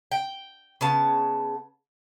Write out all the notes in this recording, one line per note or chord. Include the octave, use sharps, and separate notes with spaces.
G5
C#3 B3 A5